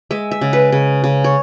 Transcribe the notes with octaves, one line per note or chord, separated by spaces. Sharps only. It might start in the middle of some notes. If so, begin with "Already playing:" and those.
G#3 E5
E5
C#3
B4
C#3
C#3
C#5